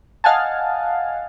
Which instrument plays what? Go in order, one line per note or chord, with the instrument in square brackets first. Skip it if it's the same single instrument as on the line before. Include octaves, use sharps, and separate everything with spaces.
[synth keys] D#5 F5 F#5 G#5 A5